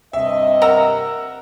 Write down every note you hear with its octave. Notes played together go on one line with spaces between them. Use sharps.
G2 C3 D#5 E5
A#4 F#5 A#5 E6